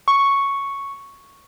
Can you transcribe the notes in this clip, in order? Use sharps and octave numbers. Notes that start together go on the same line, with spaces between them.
C#6